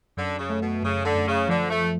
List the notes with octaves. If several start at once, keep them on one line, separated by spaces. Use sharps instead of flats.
F#2 D3
C#3
A3
B2
F#2 C#3
D3
F#2
C#3
D3 F3
A3
F3